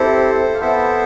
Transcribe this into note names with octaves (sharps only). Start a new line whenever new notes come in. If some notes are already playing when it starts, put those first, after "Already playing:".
Already playing: C4 E4 G4 A4 C5
F5
B3 E4 A4 C5 E5